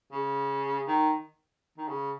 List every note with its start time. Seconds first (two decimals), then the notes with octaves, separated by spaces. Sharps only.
0.12 C#3
0.88 D#3
1.78 D#3
1.88 C#3